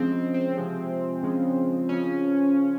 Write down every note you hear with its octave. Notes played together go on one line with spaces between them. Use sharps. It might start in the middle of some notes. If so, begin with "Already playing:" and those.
Already playing: C#3 F3 G#3 C4
C4
C4
C3 F3 G#3
C#3 F3 G#3
C#3 F3 C#4